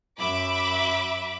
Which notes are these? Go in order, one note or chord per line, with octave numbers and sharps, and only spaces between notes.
F#2 E5 B5 D6